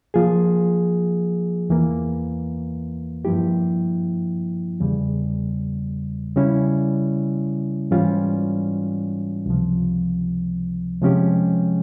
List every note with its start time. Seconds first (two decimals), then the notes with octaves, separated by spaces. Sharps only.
0.14 F3 A#3 F4 G#4
1.69 E2 E3 A#3
3.25 G2 F3 A#3 E4 G4
4.80 E2 C#3 G3
6.36 C#3 G3 C#4 E4
7.91 G#2 E3 G3 C#4 F4
9.46 C#2 C3 F3
11.02 C3 F3 G#3 C#4 G4